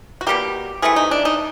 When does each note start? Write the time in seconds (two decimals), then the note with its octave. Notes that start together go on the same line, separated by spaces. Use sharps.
0.21 F#4
0.27 B2 G3 A#3 G4
0.82 C3 E3 A3 G#4
0.96 D#4
1.11 D4
1.25 D#4